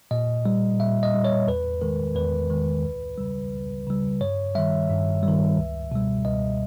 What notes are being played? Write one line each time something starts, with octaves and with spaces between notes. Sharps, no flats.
A#2 D#5
G3
A#2 E5
D#5
G3
C#5
E2 B4
D#3 G#3 A#4
E2 B4
D#3 G#3
C#2
C#3 G3
C#2
C#3 G3
G2 C#5
D#3 G3 E5
G2
G3
D#3
C#2
B2 G3
C#2 D#5